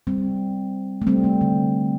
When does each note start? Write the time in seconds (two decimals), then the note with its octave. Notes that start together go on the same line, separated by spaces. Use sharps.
0.07 G3 C4
1.02 A3
1.07 G3 C4
1.24 A3
1.41 D3